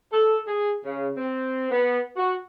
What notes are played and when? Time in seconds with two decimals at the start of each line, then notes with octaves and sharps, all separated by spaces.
0.13 A4
0.47 G#4
0.85 C#3
1.17 C4
1.71 B3
2.17 F#4